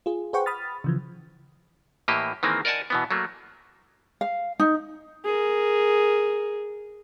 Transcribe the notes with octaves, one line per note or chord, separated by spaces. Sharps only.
F4 G#4
G#4 B4 C5 F#5 G5 C#6
B5 D#6 F6 A6
C#3 E3 F3
A2 E3 A#3 G4 D#5
D#3 E3 G#3 A#3 C4
A#4 D5 D#5 F#5 G#5 A5
B2 E3 B3
F#3 A3 A#3
F5
D#4
G#4 A#4